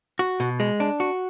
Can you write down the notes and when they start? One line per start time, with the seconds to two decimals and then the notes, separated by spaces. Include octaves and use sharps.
0.19 F#4
0.40 B2
0.60 G#3
0.80 D4
1.00 F#4